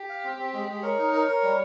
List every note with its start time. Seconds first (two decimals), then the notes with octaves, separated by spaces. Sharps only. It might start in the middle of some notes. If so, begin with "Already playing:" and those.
Already playing: G4
0.09 F5
0.24 C4
0.38 C4
0.54 G#3
0.68 G#3
0.83 A#4 C#5
0.98 D#4
1.13 A#4
1.28 A#4
1.43 G3